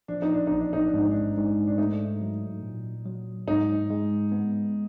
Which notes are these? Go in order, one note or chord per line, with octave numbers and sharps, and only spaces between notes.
F3 D4
D#4
D4
A1 D#4
D4
D#4
D4
G#2
D#4
D4
G#2
D4
A3 D#4
F#3
A#2
F#3
G#2 D#4
G#3
B3